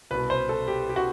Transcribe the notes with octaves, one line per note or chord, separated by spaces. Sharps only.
C2 B2 B4
C5
A4
G4
G4
F#4